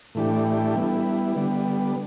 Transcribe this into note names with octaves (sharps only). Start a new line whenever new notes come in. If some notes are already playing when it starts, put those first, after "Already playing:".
A2 E3 A3 D4 G4
G3 B3 E4
D3 G3 B3